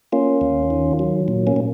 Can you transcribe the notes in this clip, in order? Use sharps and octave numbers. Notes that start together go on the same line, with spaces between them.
A#3 C#4 F4
D#2
D#3
F#3
A#2
A#3 C#4
A#2